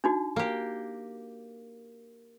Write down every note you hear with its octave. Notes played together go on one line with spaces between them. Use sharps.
D4 D#4 F#4
A#3 G4